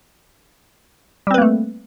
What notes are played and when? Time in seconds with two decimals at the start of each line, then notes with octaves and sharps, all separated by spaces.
1.27 G3
1.31 C4
1.34 B4
1.38 A#3
1.42 A3